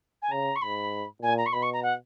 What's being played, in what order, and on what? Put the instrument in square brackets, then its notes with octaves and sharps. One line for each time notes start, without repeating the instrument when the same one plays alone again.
[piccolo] G#5
[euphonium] C#3 [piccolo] A#5
[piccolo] C#6
[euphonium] G#2 [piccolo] B5
[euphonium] A#2 [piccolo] G#5
[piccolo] A#5
C#6
[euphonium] B2 [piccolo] B5
[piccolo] C#6
A#5
F#5